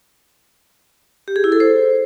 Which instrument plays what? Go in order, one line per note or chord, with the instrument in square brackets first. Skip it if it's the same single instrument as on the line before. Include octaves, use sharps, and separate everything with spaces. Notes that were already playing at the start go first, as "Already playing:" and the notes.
[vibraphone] G4
G#4
E4
A4
C5